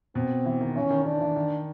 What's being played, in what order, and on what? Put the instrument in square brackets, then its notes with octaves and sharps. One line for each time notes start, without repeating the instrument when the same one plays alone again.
[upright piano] B2 [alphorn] C4
[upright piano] E3
D#3
[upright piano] E3 [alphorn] C#4
[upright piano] D#3
[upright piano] D#3 [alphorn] D4
[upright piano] E3
D#3